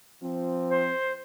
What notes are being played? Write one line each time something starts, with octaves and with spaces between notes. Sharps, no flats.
F3 C4
C5